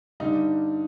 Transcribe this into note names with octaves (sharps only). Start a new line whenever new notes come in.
G2 D3 G3 D#4